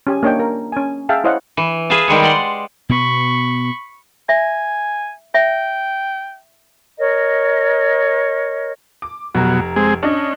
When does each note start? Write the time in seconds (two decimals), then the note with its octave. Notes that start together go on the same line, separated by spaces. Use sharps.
0.07 C#4 G4 G#5
0.23 A#3 D4 C#5 D#5 G5
0.40 A#4
0.72 C#4 G#5
1.09 G#4 E5 F5 G5 A5
1.24 E4 C5 C#5 D#5 F5 F#5
1.57 E3
1.90 G#4 B4 E5 F5 A5
2.08 D#3 G3 G#3 C#5
2.22 D5 F#5 C6
2.89 B2 B3 B5 C#6
4.29 E5 G#5
5.34 E5 G5
6.98 A#4 C#5 D#5
9.02 D6
9.35 F1 B2 F#3 A#5
9.76 G#3 C4 G#4
10.03 C#4 D4 D#5